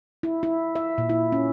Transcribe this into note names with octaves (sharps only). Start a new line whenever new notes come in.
E4
E4
E5
A#2
E4
C#4